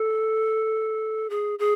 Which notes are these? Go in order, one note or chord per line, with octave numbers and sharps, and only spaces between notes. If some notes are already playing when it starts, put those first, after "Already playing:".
Already playing: A4
G#4
G#4